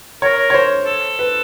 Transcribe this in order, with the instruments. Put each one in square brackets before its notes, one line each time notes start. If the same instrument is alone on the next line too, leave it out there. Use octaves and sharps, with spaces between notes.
[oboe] A#4 [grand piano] C#5
[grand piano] C#5
C5
[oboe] A4
[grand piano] B4